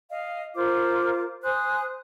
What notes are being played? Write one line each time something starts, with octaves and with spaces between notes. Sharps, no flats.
D#5 F5
F4 A#4 C5 D6
C5 G#5 D#6 F#6